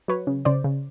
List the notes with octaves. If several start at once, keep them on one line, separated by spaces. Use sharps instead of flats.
F#3 B4 C#5
C#3
C#3 C5 D5
C#3